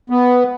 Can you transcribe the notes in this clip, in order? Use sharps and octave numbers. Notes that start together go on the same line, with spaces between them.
B3